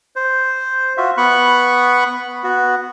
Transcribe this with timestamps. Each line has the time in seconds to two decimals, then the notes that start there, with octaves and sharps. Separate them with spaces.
0.16 C5
0.97 F4 F#4 E5
1.18 B3 B5 C#6 F#6
2.44 B3 F#4